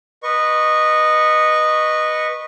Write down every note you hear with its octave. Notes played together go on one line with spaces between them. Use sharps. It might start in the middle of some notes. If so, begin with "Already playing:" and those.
B4 D#5 C#6